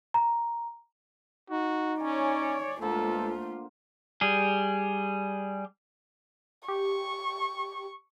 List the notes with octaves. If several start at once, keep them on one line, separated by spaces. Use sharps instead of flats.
A#5
D#4 F#4
C#4 C#5 D5 G#5
C#2 D3 A3 A#3 F4 A4 C5
G3 G#4
G4 C#6